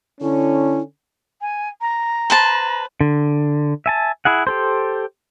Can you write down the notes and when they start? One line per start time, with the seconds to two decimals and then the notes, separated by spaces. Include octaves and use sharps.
0.21 D3 C#4 E4
1.41 G#5
1.81 A#5
2.30 B4 C5 A5
3.01 D3
3.86 E5 G#5 A5
4.25 E4 G#4 F#5
4.47 G4 A4 C5